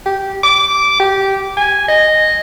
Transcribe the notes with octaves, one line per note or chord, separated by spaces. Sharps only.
G4
D6
G4
G#5
D#5